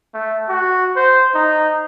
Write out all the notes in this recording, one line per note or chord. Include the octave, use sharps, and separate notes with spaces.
A3
F#4
C5
D#4